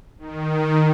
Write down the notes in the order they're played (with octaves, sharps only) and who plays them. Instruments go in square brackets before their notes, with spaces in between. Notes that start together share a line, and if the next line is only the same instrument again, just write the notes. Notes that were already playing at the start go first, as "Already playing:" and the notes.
[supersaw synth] D#3